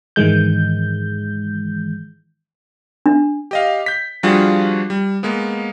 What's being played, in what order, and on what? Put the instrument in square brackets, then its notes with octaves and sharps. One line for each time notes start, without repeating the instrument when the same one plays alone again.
[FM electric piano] G#2 D#3 E3 G#3 G6
[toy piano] D4
[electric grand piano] G4 D#5 F5
G6 B6
F3 G3 D4 F4 F#4 G#4
G3
G#3 A#3 B3